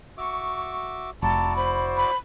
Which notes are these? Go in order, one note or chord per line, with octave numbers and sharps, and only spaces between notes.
F#4 E5 C#6 D6
F1 E4 F#4 D5 A5 A#5
C5 B5
B5